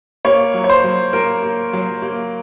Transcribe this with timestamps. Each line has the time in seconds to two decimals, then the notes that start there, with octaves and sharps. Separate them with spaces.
0.25 A#3 C#5
0.54 F#3
0.64 C#5
0.69 C5
0.84 F#3
1.13 A#3 A#4
1.43 A#3
1.73 F#3
2.02 A#3